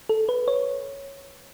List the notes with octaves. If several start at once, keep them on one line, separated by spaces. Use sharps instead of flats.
A4
B4
C#5